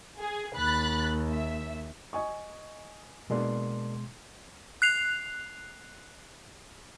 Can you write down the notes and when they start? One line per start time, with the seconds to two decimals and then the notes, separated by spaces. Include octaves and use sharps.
0.21 G#4
0.56 D#2 B5 F#6 A6
1.30 E5
2.13 D#5 G#5 C#6
3.30 B2 G#3 A#3 D4 C6
4.82 F#6 C7 F7